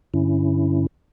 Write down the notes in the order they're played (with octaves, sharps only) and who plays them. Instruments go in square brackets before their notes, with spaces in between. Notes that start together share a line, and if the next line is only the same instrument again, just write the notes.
[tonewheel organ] G2 D3 C#4 E4